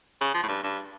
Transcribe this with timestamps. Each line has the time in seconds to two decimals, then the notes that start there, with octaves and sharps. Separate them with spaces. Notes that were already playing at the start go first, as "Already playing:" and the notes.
0.21 C#3
0.34 F3
0.43 A2
0.48 G2
0.63 G2